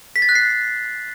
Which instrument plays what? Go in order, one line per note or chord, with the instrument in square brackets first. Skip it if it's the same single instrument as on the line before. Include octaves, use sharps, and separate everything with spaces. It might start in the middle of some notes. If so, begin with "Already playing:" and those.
[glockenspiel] B6
A6
F#6
C7